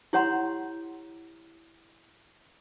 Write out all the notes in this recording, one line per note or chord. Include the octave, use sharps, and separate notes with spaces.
E4 G4 C#5 F#5 A#5 C6